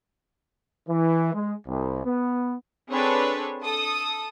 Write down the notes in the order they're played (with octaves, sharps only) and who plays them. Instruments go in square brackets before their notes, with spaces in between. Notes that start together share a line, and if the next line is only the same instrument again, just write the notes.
[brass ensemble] E3
G#3
C2
B3
[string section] C4 D4 G#4 A4 B4 C#5
A4 D#6